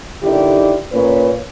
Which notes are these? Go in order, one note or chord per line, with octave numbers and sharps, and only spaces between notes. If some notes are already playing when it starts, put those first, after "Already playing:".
D#2 D3 D#3 E4 G4 D5
A#2 A#3 C#4 B4 C#5